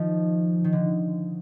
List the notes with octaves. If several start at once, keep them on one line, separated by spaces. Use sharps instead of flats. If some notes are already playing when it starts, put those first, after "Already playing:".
Already playing: D#3 F3
D#3
D3